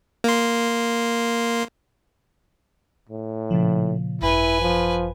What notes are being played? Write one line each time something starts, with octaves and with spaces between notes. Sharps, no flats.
A#3 C6
A2
A#2 C#3 F3
G#1 F#2 E4 B4 G#5
F3